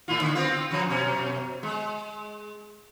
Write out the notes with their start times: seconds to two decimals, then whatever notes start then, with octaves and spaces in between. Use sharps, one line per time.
0.08 A2 E4 F4
0.21 D3
0.35 B3 C4 F4
0.71 F#2 F3
0.90 F#2 B2 C#4
1.63 G#3